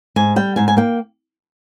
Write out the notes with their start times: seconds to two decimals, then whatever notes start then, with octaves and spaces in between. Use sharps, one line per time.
0.16 G#2 G#5
0.36 G3 G5
0.56 G#2 G#5
0.68 G#5
0.77 A#3 G5